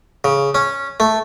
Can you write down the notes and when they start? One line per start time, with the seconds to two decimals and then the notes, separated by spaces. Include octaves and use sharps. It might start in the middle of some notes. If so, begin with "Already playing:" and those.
0.24 C#3
0.55 C#4
1.00 A3